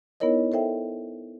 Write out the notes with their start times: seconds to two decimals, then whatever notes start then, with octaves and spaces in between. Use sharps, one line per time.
0.20 B3 D#4 E4 A#4 C#5 D#5
0.52 A4 C5 E5 G5